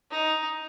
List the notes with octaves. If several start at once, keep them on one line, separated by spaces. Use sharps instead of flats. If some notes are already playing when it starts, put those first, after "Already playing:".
D#4